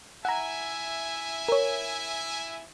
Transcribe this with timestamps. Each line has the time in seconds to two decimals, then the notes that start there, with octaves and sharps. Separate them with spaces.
0.25 E4 E5 F#5 G#5 A#5
1.48 A#4 C#5